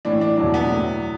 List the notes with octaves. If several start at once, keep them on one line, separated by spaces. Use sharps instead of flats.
A2 E3 D4
D4
E2 B2 F#3 D4
B3
A2 F#3